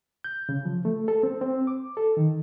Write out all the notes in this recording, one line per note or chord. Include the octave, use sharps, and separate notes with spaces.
G6
C#3
F3
A3
A4
C4
C4
D6
A4
D#3